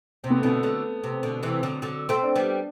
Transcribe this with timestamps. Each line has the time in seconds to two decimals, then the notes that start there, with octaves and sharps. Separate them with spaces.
0.24 C3 C4
0.30 B3
0.38 A3
0.43 B2 D3 B3
0.63 D3 F#3 A3
1.04 C3
1.23 B2 D3
1.43 C3 E3
1.63 D3 F#3
1.82 D3 F#3
2.09 A3 C4
2.23 D4
2.36 G3 B3